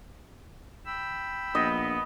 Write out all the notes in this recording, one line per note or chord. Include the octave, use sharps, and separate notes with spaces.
G5 B5 E6
A#1 B3 D#5